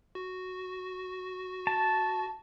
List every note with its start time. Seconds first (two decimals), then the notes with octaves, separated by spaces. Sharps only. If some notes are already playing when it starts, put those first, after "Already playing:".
0.15 F#4
1.67 A5